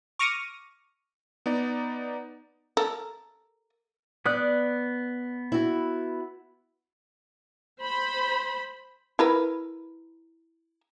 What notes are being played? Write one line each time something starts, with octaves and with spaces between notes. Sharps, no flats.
C#6 D6 F6 A#6 C#7 D#7
B3 D#4 D5
A4 A#4
B3 D5 D#6 F#6
E4 F#4
C5 B5
E4 A#4 B4